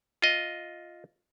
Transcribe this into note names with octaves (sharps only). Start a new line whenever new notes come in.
F4 D#5